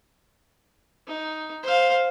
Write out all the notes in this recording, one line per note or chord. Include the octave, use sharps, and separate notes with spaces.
D#4
C5 F5